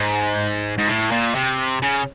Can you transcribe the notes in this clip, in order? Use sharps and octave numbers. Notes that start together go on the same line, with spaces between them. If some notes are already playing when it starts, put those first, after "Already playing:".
Already playing: G#2
G#2
A2
A#2
C3
C#3